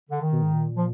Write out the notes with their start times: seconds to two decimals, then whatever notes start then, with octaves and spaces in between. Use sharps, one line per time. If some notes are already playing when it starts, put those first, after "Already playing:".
0.10 D3
0.22 D#3
0.32 B2
0.42 G#2
0.53 A#2
0.76 F3